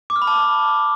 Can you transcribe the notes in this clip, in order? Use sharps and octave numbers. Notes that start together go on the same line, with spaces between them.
D6
F6
B5
A5